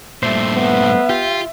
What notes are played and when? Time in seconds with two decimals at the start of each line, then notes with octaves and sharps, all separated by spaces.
0.23 G2 A#2 A3 C5 E5
0.54 B3
1.10 F4 G4